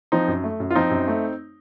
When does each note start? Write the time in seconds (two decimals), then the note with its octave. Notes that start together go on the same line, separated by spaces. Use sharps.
0.12 F3 C4 D#4
0.28 F#2
0.44 A3
0.60 F#2
0.70 F4
0.75 F3 C4 D#4
0.91 F#2
1.08 A3